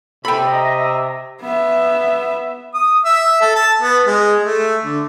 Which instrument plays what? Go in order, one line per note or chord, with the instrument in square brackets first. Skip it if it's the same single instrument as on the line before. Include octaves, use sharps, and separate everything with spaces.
[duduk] C3 [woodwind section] A4 [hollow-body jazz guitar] G5 B5
[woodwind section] D#5 E5 A#5
[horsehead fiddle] B3 E5
[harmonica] D#6
E5
A4
A5
B3
G#3
A3
D3